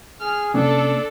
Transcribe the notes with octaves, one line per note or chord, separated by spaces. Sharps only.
G#4 F6
C3 A#3 C#4 D4 A4